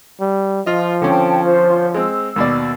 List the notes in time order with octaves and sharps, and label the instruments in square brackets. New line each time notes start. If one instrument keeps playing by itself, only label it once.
[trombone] G3
[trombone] F3 [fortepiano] F4 D#5
[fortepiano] D3 C4 C#4 [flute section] G5 A5
[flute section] F4 C5
[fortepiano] G#3 C4 [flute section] E6
[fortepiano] D#2 B2 D5